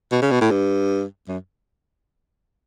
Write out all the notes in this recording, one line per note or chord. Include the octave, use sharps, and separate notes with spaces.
B2
C#3
B2
A2
G2
F#2